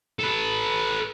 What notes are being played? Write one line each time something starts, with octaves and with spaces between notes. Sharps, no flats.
A4 B4